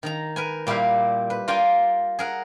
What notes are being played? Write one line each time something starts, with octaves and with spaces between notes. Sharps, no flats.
D#3 D#4 A#5
A#4 B4 G#5
A#2 G3 E4 G4 F5
B4
F4 A#4 D5 G5 G#5
G#4 A#4 F#5